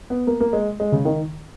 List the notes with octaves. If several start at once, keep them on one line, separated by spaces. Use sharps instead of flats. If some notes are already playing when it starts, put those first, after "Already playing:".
B3
A#3
A#3
G#3
G#3
C#3
D#3